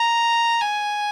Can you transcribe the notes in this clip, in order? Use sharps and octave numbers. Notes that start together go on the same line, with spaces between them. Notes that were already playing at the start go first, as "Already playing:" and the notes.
Already playing: A#5
G#5